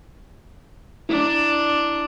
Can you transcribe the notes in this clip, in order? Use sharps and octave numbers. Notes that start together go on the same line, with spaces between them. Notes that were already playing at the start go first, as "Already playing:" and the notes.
D4 E4